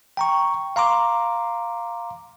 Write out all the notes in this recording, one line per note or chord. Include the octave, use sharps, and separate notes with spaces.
G5 A#5 C#6
F5 A#5 C6 D6